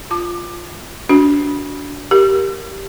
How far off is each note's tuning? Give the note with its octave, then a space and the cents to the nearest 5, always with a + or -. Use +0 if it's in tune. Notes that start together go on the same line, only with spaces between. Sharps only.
F4 +0 A5 +5 D6 +25
D4 -25 F#4 +0
G4 -10 A#4 +0